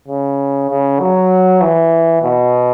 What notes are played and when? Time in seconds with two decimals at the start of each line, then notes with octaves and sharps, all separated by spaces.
0.08 C#3
0.70 C#3
1.00 F#3
1.61 E3
2.22 B2